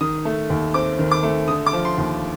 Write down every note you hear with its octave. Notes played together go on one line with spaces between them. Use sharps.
D#3 D#6
A3
D#2
C4 D6
D#3
D6
A3
D3 D#6
D6
F3
C6
D#2